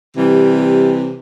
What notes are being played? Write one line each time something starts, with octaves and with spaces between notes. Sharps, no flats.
C3 E3 G3